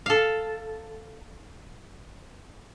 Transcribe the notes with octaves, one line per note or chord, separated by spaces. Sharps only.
A4 F5